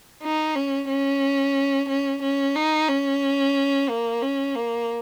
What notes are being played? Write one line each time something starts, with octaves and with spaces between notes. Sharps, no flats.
D#4
C#4
C#4
C#4
C#4
D#4
C#4
A#3
C#4
A#3